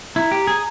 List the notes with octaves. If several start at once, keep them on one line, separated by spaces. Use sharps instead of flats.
E4 A#5
G4
G#4